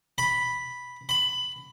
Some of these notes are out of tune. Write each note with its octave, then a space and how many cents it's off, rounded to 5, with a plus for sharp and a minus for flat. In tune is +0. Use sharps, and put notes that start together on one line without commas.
B5 -5
B5 +15